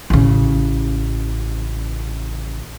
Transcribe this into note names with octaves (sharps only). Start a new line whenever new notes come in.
A1 C#3